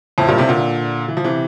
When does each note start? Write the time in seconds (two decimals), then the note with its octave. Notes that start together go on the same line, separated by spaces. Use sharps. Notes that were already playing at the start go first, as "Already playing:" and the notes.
0.18 F2 A2
0.28 G2 A#2
0.38 A2 C3
0.48 A#2 D3
1.08 E3
1.17 F3
1.24 C3 E3